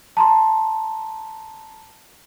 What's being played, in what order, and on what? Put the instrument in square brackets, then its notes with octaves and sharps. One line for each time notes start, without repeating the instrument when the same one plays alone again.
[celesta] A5 A#5 C6